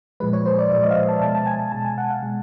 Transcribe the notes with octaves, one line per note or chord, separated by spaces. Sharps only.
A#2 F3 G#3 B4
C#5
C5
D5
A#2 F3 G#3 D5
D#5
F5
E5
A5
B2 G#3 A5
A5
G#5
A5
B2 G#3 A5
G#5
F#5
F5
B2 G#3